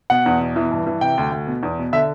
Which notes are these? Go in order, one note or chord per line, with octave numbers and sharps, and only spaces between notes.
B2 F#5
E2
B2
E3
G2
E3
C3 G5
D2
D2
B2
E2
B2
D3 E5